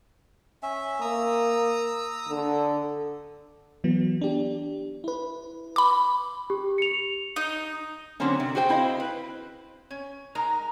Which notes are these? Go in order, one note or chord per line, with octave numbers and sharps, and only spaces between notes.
C#4 E5
A#3 A#5 D#6 E6
D3
E3 F#3 B3
D4 G4
E4 B4
B5 D6
G4
C#7 F7
D#4
D3 F#3 A#3 C4 C#4
C3
F#4 G#4 C5 G5
C4 E4 C5 D#5 F5
B4
C#4
G#3 D#4 A#4 A#5